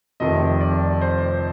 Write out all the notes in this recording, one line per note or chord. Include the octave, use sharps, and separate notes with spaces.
F1 F2 C3 D#3 D#5
D5
C5